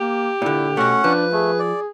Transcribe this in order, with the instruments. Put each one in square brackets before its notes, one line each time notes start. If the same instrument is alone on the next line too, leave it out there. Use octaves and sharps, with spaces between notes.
[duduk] A#3 [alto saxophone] G4
[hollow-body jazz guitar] A#2 D3 [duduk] E4
[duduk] B2 [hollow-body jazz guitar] A3 F#4 [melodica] C#4 F#5
[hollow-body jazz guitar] F3 [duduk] D4 [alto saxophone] B4
[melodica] A3 [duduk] G#4
[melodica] D5